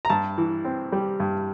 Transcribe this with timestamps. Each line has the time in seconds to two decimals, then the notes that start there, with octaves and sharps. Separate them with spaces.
0.05 A#5
0.10 G2 A5
0.38 E3
0.65 C4
0.92 G3
1.20 G2